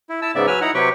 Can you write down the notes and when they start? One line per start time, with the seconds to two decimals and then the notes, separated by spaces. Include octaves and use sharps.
0.09 E4
0.22 E4 A5 E6
0.35 G#2 C#3 B3 D5 E5
0.47 F#3 B4 G#5 E6 F6
0.61 D#4 E4 F#5 A#5
0.74 C3 F#3 G4 B4 G5 C#6